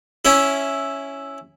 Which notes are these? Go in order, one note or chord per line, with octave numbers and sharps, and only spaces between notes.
C#4 E4